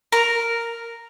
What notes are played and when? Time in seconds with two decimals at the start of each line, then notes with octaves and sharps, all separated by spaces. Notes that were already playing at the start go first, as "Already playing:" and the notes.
0.12 A#4 A#5